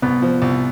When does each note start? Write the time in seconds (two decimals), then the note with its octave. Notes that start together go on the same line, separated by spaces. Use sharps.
0.02 C2 B3
0.22 F3
0.42 C2